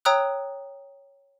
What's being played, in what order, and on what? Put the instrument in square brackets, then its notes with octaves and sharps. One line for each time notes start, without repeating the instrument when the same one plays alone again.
[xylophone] C#5 G5 A#5 D#6 E6 F#6